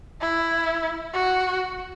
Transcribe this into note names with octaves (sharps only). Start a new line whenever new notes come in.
E4
F#4